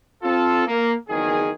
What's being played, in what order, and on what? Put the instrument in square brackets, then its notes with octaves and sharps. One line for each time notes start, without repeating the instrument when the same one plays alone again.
[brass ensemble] C4 F4 A4
A#3
F#1 E2 D#3 G#4